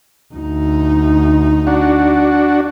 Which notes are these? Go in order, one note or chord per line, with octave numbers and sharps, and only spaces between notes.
D2 D#4
D4 F#4